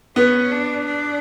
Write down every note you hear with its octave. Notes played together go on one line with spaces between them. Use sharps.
B3 C#4
D4
D4